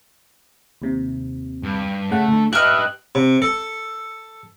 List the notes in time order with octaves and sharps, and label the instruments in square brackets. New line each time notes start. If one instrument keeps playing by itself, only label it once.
[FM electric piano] D#2 C3
[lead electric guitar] G2
[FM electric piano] C#3 F#5 [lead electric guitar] A3
[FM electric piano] D2 D3
[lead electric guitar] G4 B4 [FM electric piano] D#5 F#6 [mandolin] E5 F6
[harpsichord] C3
A4